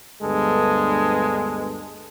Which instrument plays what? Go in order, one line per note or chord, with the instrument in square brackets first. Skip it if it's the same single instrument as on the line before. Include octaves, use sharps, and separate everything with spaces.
[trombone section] D2 G2 G#3 B3 A4